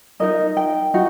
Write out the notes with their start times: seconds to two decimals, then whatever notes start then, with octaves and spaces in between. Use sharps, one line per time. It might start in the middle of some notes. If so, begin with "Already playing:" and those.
0.20 D#4 F#4 A#4 D#5
0.57 G5
0.94 D#4 F#4